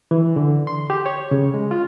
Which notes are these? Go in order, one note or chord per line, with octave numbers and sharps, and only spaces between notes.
E3
D3
C6
G4
C#5
C#3
G#3
F4